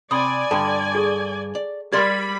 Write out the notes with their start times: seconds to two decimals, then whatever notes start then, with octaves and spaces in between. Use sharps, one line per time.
0.11 C3 D5 G#5 B5 D#6
0.51 G2 D3 A4 G5 A5
0.95 G#4 A4 C#6
1.55 D5
1.93 G3 G4 A#4 D5 B5 C6 G#6 A6